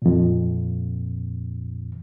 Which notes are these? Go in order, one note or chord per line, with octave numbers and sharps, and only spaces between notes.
F2 A#2